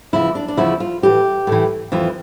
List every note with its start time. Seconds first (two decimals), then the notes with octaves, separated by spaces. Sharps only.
0.13 E2 C#3 F3 E4
0.35 D4
0.48 D4
0.57 E2 C#3 F3 E4
0.80 F4
1.02 A2 E3 G4
1.47 A2 E3
1.92 F2 E3 F4